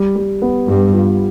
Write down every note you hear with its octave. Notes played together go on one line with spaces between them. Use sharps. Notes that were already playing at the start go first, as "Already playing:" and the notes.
Already playing: G3
G3
B3
G2 G3
F4